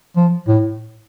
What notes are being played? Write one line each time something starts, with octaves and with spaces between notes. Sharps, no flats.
F3
A2